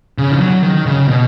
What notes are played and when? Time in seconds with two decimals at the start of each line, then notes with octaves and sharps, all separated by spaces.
0.18 C#3
0.32 D#3
0.41 F#3
0.63 D#3
0.86 C#3
1.08 B2